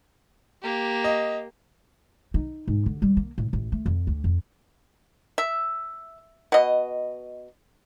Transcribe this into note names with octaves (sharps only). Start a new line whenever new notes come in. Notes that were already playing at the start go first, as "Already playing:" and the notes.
A#3 G4
D#5
D#4
G#2
D3
G3
A#3
A2
A1
A3
F2
D2
F2
E5
B2 D#5